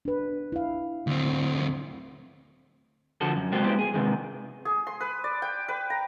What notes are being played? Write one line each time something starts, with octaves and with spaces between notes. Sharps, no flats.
D4 B4
E4 F5
D2 C4
D3 F3 F4 F#4 A4
F#2
C3 G#3 F#4 A4 C5 G5
G#3 B3 E4 G4 C5
G#4
C3 D#3 G#3
G#4
C6
B4
D5
G5
B4
A#5